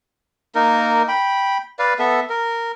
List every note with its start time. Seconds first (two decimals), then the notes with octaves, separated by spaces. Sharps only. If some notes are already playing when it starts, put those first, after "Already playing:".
0.55 A#3 D#4 A#4
1.08 G5 B5
1.79 B4 D5 F5
1.99 B3 A4 E5
2.30 A#4